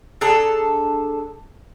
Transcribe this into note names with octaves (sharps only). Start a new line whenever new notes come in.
D4 G#4 A4 A#5